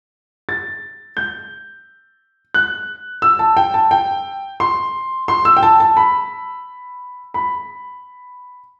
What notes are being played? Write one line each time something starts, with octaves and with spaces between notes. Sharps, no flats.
A6
G6
F#6
E6
A5
G5
A5
G5
C6
C6
E6
G5
A5
A5
B5
B5